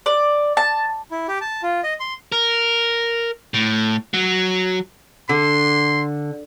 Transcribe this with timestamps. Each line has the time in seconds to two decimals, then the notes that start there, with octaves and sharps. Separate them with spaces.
0.06 D5
0.57 A5
1.11 E4
1.28 G4
1.41 A5
1.63 F4
1.83 D#5
2.00 C6
2.32 A#4
3.54 A2
4.14 F#3
5.29 D3 C6